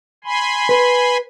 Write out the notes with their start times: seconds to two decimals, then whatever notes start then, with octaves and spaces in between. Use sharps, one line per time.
0.24 G#5 B5 C6
0.69 B4